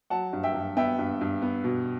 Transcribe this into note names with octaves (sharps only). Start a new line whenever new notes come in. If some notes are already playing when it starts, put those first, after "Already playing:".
F#3 F#5 A5
G2
E5 G5
G2
B3 E5 G5
G2
G2
B3
B2